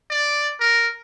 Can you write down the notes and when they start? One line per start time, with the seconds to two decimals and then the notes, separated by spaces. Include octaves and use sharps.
0.10 D5
0.60 A#4